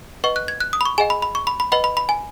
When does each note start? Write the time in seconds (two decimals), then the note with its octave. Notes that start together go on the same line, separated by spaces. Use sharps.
0.24 B4 D#5 F#5 C#6
0.36 F#6
0.48 G#6
0.60 F#6
0.73 D#6
0.81 B5
0.85 C#6
0.98 G#4 D#5 F#5 G#5
1.10 B5
1.22 B5
1.35 C#6
1.47 B5
1.60 B5
1.72 B4 D#5 F#5 B5
1.84 B5
1.97 B5
2.09 G#5